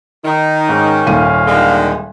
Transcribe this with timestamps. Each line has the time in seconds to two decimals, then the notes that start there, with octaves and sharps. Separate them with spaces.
0.25 D#3 D#4
0.69 G#2 C#4
1.07 D#1 A#2 F5 D#7
1.47 D3 D#3 G#3